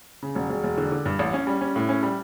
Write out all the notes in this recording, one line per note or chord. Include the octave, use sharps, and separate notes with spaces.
C#3
E1
E1
E1
D3
D3
G2
A1
C#4
G3
C#4
A2
C#4
G3